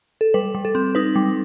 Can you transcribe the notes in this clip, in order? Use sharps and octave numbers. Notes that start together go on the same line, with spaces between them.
A4
G3 B4
G3
A4
C4
D#4 B4
G3